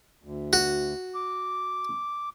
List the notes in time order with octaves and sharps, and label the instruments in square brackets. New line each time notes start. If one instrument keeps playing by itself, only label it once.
[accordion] D2
[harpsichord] F#4
[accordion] D6